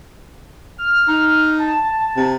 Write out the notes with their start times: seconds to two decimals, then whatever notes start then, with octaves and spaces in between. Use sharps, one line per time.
0.78 F6
1.08 D#4
1.59 A5
2.17 C3